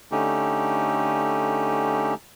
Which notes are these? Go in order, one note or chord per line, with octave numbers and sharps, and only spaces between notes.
D3 A3 C#4 D#4 G4